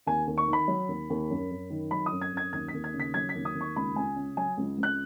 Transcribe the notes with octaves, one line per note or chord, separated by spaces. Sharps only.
D#2 G#5
D#2
C#6
D#3
B5
F#3
D#2
D#2
F#2
F#2
D#3
F#3 B5
D#6
F#2
G#6
F#2 G#6
D#2 G#6
B6
D#2
G#6
C#3
B6
F#3 G#6
B6
D#2
D#6
D#2
C#6
C#2 B5
C#2 G#5
C#3
F#3 G#5
C#2
C#2
F#6